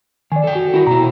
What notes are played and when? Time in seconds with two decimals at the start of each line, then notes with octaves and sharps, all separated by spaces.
0.32 D#3 D5 G#5
0.44 A4 G5
0.55 F#4
0.74 E4 F#4 A#4
0.87 B2 E4 A#5